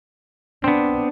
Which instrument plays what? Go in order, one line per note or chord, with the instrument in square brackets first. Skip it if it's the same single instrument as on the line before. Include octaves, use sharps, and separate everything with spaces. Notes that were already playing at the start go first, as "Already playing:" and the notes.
[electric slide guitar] B3 C4 [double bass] D4